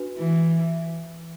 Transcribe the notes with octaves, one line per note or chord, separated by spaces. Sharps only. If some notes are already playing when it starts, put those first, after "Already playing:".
Already playing: D4 F#4 B4
E3